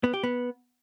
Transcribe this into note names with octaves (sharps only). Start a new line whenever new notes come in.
B3
G4
B3